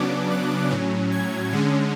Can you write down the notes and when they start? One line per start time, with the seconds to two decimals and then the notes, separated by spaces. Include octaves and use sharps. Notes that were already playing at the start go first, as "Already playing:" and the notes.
Already playing: C#3 F#3 B3 D4 D6
0.30 F#6
0.70 A2 F#3 C#4
1.12 G#6
1.52 D3 G#3 C#4